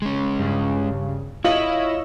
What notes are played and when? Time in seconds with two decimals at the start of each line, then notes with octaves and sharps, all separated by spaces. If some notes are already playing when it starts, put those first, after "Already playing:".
0.02 G#3 C#4
0.39 G2 C#3
1.44 E4 F4 C#5 D#5 E6 F#7